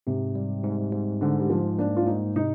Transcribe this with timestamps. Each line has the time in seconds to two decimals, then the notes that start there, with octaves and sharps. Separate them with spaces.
0.07 G#2 C3
0.35 G3
0.64 G#2
0.93 G#2
1.21 G#2 D3
1.39 G3
1.50 G#2 F3
1.78 A#3 D4
1.97 F4
2.06 G#2 D#4
2.36 C3 D#4